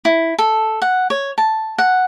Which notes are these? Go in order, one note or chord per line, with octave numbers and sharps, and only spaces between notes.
E4
A4
F#5
C#5
A5
F#5